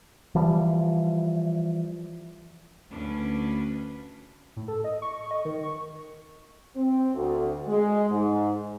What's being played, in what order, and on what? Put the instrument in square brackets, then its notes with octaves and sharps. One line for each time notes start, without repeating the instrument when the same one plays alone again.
[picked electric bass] E3 F3 G3
[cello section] D2 C#4 D4 B4
[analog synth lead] A2
A4
D#5
C#6
C#6
D#5
D#3
C#6
[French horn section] C4
D2
G#3
G#2